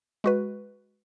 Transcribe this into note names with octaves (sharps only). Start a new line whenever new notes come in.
G#3 F#4 B4